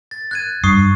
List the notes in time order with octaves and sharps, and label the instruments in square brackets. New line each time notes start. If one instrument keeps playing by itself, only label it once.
[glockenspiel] A6
F#6 G#6 D#7
[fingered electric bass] G2 [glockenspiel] C#6 D#6 C7